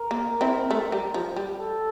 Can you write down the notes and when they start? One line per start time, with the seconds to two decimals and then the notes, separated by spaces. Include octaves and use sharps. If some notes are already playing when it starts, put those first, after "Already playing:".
Already playing: A#4
0.11 A#3
0.41 C4 E4
0.71 A3
0.92 G3
1.14 F3
1.36 G3
1.59 A4